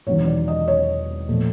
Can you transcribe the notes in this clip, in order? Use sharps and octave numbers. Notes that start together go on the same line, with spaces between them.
E1 E2 C3 D#3 F#3 C#5
D5
D#5
C#5
A#2 F3 A3